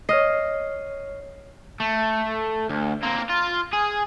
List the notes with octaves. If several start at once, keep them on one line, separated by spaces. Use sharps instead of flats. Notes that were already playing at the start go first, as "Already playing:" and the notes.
C#5 D#5 F6 C7
A3
D2
A#3 C4
F4
G#4